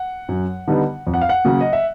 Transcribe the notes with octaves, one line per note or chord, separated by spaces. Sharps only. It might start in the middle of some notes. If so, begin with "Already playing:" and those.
Already playing: F#5
F#2
D3 G3 B3 D#4
F2
F#5
F5
F#5
C#3 F#3 A#3
D#5
E5